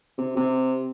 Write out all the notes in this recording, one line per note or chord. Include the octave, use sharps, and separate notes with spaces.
C3
C3